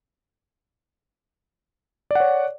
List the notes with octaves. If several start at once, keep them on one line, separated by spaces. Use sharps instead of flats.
C#5 D5 F#5